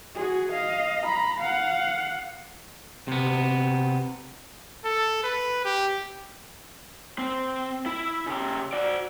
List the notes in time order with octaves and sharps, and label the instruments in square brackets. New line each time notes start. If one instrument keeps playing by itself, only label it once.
[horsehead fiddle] F#4 G#4
D#5 F5
A#5 B5
F5 F#5
[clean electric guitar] C3 B3
[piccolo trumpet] A4
B4
G4
[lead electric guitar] C4
E4
C#3 G4
F#4 D5